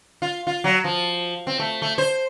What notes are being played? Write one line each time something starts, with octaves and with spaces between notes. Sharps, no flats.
F4
F4
F#3
F3
C4
A3
A3
C5